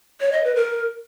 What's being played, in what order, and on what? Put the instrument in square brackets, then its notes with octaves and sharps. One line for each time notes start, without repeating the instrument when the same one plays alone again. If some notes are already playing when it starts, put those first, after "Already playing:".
[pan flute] C#5
D#5
B4
A#4